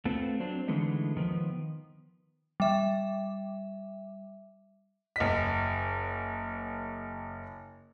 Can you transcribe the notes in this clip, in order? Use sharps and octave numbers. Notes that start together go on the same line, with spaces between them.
A3 B3 C4 F4
F#3 C4 D4
D3 E3 G#3 A3 B3 D#4
D#3 F3 B3
G3 E5
F#1 D#5 B6